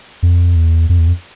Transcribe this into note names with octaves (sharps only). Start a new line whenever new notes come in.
F2
E2
F2
E2
F2